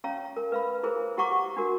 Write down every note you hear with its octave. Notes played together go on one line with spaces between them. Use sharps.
C#4 C#5 F5 A#5
A#4
B4 F5 B5
E4 G#4 A#4 C5
E4 G4 F#5 A#5 C#6 D6
D4 F#4 A#4